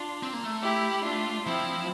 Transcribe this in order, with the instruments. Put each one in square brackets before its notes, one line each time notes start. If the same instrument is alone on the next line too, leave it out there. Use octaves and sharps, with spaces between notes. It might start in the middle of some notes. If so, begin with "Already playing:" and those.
Already playing: [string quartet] D4 F4
[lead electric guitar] C4
A#3
A3
[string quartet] E4 G4
D4 F4
[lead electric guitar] F3 [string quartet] C4 E4